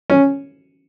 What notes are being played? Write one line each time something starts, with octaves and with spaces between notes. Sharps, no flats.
C#4